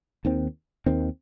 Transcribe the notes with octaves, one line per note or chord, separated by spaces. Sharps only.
D#2 D#3 C4
D#2 D#3 C4